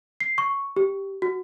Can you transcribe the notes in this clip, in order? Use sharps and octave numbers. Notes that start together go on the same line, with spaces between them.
C7
C#6
G4
F#4